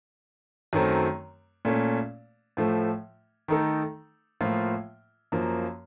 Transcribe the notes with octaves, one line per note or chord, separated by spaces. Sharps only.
F#2 D#3 F#3 A3 C4
A#2 A3 C#4
A2 F3 A3
D#3 A3 D#4 A4
A2 F3 A#3 F4
F#2 F3 A#3